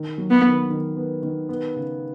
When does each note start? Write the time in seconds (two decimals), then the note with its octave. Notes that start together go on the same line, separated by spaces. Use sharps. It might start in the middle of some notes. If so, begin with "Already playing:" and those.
Already playing: D#3
0.18 F#3
0.31 B3
0.44 D#3
0.70 D#3
0.97 B3
1.23 D#3
1.49 B3
1.76 C#3